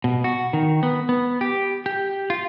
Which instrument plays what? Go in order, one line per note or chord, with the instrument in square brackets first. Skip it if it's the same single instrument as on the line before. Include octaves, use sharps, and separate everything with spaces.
[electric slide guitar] B2
F#4
D#3
B3
B3
G4
G4
F4